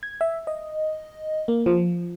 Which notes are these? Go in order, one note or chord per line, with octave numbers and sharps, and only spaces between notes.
G#6
E5
D#5
A#3
F3